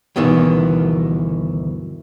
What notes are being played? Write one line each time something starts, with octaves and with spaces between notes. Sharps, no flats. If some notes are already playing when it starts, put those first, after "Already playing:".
D2 G2 B2 D#3 E3